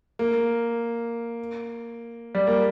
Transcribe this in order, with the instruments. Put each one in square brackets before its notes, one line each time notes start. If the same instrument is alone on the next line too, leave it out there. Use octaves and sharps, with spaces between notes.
[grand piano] A#3
G3
A#3